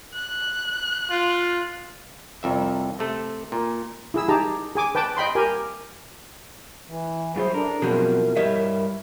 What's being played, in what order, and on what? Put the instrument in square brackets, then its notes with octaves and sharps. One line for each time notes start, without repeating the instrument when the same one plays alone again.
[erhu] F#6
[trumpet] F4
[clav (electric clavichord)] C2 F2 E5
C3 A3 A4
A#2
[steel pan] E4 G#4 E6
D#4 G4 G#4 A5 A#5
G#4 G#5 D6
B4 G5 A5 D6
D#5 G5 B5 C6
G4 A#4 G#5
[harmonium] E3
[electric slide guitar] F#2 F4 C5 [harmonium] E4 [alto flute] G#4
[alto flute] D4 [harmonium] A4 [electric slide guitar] A#4
[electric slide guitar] F#2 C4 G#4 [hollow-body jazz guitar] B2 F3 F#4 [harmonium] E4 [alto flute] A#4
[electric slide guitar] G2 E5 [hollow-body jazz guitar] G4 C#5 D#5